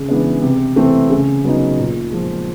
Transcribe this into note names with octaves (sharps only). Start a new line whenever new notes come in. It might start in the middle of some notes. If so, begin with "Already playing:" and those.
Already playing: C#3
E3 G#3 B3 D4
C3
E3 A3 C4
C#3
F#3 B3 D#4
A#2
F3 G#3